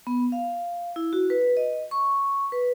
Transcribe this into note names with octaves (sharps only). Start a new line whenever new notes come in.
B3
F5
E4
F#4
B4
D#5
C#6
B4